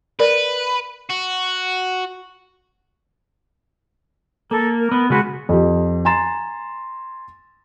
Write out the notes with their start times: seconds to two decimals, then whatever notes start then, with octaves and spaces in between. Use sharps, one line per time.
0.20 A#4 B4 D5
1.10 F#4
4.51 A#3 A4
4.79 A#4
4.91 B3
5.10 C#3 G#3 F#4 B4
5.49 F2 G4
6.05 G#5 A#5 C6 A6 E7